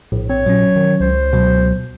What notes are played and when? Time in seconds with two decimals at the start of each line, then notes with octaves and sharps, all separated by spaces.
0.12 A#1 A2
0.29 C4 C#5
0.46 A#2 F#3 C#4
0.76 D#3
1.00 C#2 C5
1.33 B2 F#3